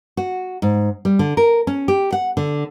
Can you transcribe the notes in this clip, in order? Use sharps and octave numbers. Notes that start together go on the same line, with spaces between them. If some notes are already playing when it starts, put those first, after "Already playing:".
F#4
G#2
G3
D3
A#4
C#4
G4
F#5
D3